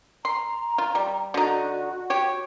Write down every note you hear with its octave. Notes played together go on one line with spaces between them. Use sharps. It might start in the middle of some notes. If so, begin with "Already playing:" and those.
A#5 C6
F4
G3
D3 D#4 F#4
G4 C#5